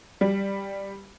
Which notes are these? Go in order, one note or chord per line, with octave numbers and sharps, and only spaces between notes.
G3